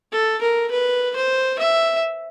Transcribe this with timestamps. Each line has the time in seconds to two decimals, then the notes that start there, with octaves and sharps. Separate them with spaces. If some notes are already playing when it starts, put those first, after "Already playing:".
0.12 A4
0.42 A#4
0.71 B4
1.16 C5
1.59 E5